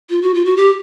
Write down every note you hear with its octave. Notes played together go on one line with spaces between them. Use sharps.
F4
F#4
F4
F#4
G4